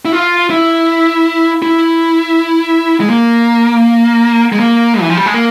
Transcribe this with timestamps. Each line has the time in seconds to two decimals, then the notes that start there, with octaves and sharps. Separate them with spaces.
0.05 E4
0.12 F4
0.50 E4
1.62 E4
3.00 G#3
3.10 A#3
4.52 G#3
4.60 A#3
5.01 E3
5.09 F3
5.17 G3
5.26 G#3
5.34 A#3